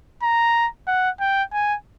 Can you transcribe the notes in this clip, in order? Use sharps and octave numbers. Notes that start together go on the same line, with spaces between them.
A#5
F#5
G5
G#5